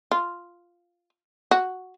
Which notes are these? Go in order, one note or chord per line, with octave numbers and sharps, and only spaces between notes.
F4
F#4